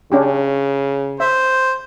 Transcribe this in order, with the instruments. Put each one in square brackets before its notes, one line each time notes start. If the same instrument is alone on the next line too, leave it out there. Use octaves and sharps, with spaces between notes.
[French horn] C#3 [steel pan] C#4 D4 G4
[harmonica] C5 [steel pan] E5